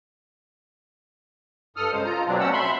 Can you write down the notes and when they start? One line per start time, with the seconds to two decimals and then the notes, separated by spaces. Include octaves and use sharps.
1.76 G2 A4 D#6 F6
1.91 C#3 G#3 C5
2.05 F4 A#5
2.27 B2 F#3 C4 D4
2.40 F#3 A3 C4 C#4 F#5 E6
2.53 E5 B5 C6